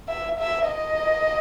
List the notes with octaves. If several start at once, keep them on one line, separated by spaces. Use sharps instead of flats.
E5
E5
D#5